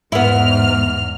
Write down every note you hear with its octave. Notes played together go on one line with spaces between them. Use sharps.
E2 G#2 B3 E4 F6